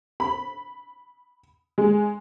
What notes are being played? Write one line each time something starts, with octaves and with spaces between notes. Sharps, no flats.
B5
G#3